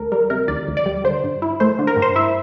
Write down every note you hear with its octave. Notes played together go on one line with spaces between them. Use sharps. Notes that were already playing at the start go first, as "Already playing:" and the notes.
Already playing: D2 A4 A#4
G3 A#4
C3 A#4
D2 D5
D2
D5
G3
D3 C5
G2
E4
A3 C5
D3
A#4
G2
C5
E4 E5